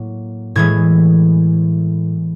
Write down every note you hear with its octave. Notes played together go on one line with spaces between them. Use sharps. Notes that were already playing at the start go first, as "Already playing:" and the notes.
Already playing: A2 F#3 A#3
A2 E3 G#3 G#6